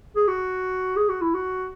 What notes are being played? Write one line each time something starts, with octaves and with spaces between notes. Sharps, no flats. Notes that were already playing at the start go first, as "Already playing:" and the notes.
G#4
F#4
G#4
F#4
E4
F#4